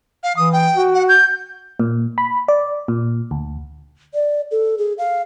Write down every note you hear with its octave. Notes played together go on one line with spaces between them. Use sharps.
F5
E3 D#6
G5
F#4
F#5
G6
A#2
B5
D5
A#2
D2
D5
A4
G#4
F5